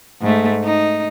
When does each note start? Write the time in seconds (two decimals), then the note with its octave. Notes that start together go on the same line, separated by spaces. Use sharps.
0.22 G#2 A3
0.63 D#4